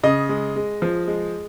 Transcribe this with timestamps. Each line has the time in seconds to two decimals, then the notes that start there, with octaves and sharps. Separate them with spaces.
0.03 C#3 D#5
0.29 G#3
0.56 G#3
0.82 F3
1.07 G#3